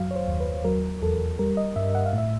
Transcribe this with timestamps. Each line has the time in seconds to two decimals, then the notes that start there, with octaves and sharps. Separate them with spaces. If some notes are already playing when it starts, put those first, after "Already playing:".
Already playing: F#2 F#3 F5
0.11 C#5
0.16 C5
0.28 D#2
0.40 B4
0.64 F#3 A#4
1.02 E2 A4
1.39 G3 A#4
1.57 D#5
1.76 G2 E5
1.95 F#5
2.06 F5
2.13 A2 E5